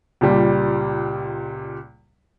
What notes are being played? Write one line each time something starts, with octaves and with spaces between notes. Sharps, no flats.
C#2 A#2 G3